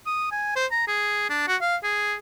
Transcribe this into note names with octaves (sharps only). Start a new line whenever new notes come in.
D#6
G#5
C5
A#5
G#4
D4
F#4
F5
G#4